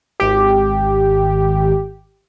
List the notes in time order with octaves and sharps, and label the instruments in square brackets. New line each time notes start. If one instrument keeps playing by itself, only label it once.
[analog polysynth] G#1 G4